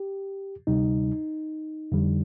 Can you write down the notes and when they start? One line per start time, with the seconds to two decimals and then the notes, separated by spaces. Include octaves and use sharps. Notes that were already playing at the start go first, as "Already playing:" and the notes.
Already playing: G4
0.67 D2 C3 G3 D#4
1.92 F2 D3 G3